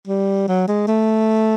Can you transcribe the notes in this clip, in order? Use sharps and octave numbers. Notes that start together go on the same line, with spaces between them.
G3
F#3
G#3
A3